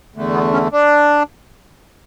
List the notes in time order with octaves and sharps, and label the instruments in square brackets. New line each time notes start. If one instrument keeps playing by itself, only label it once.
[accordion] E2 D3 A3
B3
C#4
D4